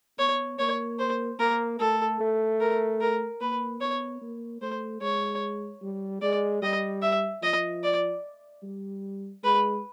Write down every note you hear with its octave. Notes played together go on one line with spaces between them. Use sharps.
B3 C#5
A#3 C#5
C5
A#3 A#4
A3 A4
A3
A#4
A#4
A#3 B4
B3 C#5
A#3
A3 C5
G#3 C#5
G3
G#3 D5
G3 D#5
E5
F3 D#5
D5
G3
G#3 B4